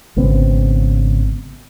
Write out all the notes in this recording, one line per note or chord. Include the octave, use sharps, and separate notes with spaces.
G#1 C#3 B3 C4